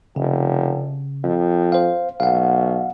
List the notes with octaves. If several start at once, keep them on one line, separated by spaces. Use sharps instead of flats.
F1 C#3
F2
C5 F5
B1 F5 F#5